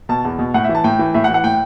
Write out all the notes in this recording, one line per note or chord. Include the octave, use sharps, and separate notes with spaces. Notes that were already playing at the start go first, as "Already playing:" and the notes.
B2 A5
E2
B2
A2 F#5
E5
E3
A5
A2 G5
E3
A2 E5
F#5
E3
F#5
A2 G5